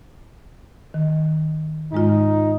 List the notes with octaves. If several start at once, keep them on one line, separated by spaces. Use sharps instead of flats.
D#3
G#2 G#3 D#4 F4